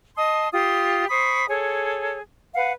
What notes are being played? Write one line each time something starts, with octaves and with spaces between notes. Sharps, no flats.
D#5 A5 C6 D#6
F4 G4 C6 D#6
C5 B5 C#6 D#6
G#4 A4 C#5
B4 F5 F#5